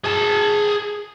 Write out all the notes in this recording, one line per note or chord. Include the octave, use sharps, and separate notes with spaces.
G#4 A5